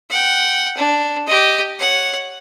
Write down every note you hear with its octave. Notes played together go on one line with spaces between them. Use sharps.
F#5 G5
D4
G4 D#5
C#5 F#5